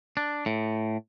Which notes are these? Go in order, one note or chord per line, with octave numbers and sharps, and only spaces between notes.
D4
A2